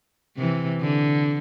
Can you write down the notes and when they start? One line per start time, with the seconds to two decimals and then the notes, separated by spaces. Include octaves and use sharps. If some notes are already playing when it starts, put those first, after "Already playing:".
0.37 C3 E3
0.80 D3